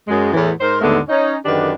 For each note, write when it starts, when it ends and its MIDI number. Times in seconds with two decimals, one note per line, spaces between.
0.08 0.32 42
0.08 0.32 56
0.33 0.51 40
0.33 0.51 45
0.33 0.51 52
0.60 0.77 44
0.60 0.77 63
0.60 0.77 70
0.60 0.77 72
0.81 0.99 39
0.81 0.99 44
0.81 0.99 50
0.81 0.99 56
0.81 0.99 57
0.81 0.99 59
1.09 1.36 61
1.09 1.36 63
1.45 1.72 42
1.45 1.72 50
1.45 1.72 51
1.45 1.72 62
1.45 1.72 67
1.45 1.72 71